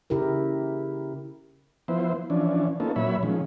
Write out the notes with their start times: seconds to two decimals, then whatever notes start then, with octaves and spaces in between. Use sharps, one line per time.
0.10 C#3 E4 G4 A#4
1.88 F3 B3 E4 C5
2.30 E3 F3 C#4 D4
2.80 A#3 B3 C#4 D#4 F4 A4
2.96 A#2 F#3 C#5 E5 B5
3.23 D#3 F3 G#3 C#4